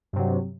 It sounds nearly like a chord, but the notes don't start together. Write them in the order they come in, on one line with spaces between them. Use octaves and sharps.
G2 C3 F#3